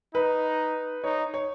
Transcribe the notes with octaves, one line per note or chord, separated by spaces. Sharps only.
D#4 B4
D#4 C#5
C#5